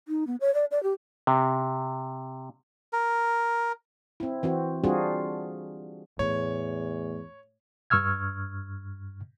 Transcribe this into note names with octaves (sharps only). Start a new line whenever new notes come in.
D#4
B3
C#5
D5
D5
G4
C3
A#4
C4 E4
E3 C4 F#4
G3 C4 D4 F4 F#4 G#4
E2 A2 C#5
G2 C#6 E6 F6 G#6